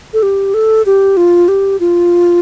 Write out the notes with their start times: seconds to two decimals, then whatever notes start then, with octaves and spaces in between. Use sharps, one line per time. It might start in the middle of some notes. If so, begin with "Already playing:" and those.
0.13 A4
0.23 G4
0.54 A4
0.86 G4
1.17 F4
1.48 G4
1.80 F4